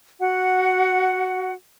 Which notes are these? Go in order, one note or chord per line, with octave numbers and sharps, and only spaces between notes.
F#4 F#5